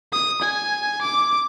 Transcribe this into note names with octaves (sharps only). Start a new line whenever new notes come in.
D#6
G#5
D6